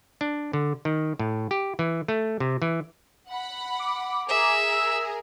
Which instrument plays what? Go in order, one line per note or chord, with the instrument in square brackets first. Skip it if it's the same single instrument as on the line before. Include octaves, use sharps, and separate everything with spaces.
[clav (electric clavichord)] D4
D3
D#3
A2
G4
E3
A3
C3
E3
[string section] F#5 B5
[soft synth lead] D6
[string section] G#4 A#4 A#5 [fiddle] E5
[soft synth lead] E6